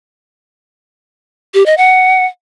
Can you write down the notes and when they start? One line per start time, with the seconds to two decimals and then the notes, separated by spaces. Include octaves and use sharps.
1.54 G4
1.66 D#5
1.78 F#5